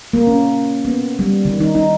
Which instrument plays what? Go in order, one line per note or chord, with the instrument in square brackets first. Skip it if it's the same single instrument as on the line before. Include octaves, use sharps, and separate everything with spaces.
[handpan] A#3
C#4
B3
G3
D#3
D#4
D#4